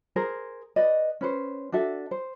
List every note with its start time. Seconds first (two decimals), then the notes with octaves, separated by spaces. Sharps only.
0.16 G#4 A#4 C5
0.76 B4 D5 D#5
1.21 C#4 B4 C5
1.72 D4 F#4 A4 E5
2.11 C5